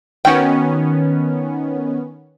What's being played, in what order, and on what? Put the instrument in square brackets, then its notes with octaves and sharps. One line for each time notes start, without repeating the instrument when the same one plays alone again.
[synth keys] D#3 B3 C#4 [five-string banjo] F#4 G5